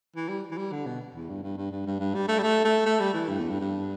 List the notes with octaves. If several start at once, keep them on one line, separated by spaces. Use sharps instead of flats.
E3
G3
E3
G3
D3
B2
E2
G2
G2
G2
G2
G2
G2
G3
A3
G3
A3
A3
A3
G3
E3
G2
E2
G2
G2